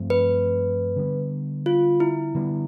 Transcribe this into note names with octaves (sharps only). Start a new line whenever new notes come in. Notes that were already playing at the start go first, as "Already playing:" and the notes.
Already playing: G2 F3 A3 C4
B4
D3 G3 B3
F4
E4
D3 G3 B3 D4